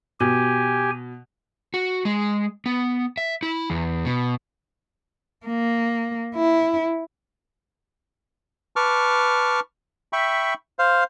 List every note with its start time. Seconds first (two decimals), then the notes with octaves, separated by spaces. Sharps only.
0.20 B2 G4 G#5
1.74 F#4
2.05 G#3
2.66 B3
3.17 E5
3.43 E4
3.70 E2
4.05 B2
5.46 A#3
6.35 E4
8.76 B4 A5 C#6 D6 F6
10.13 E5 G5 B5 C#6
10.79 C5 F5